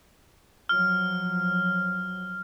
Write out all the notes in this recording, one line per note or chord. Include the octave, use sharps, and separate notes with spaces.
F3 F#3 F6